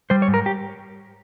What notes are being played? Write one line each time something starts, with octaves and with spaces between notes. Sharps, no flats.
G3 C5
C#5
G#2
A#4
G4